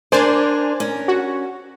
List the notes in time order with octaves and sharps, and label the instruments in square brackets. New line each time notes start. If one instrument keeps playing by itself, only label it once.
[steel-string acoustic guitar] D4 A#4 [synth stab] C5 D5 G#5
[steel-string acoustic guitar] C#4 A#4
[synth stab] F#4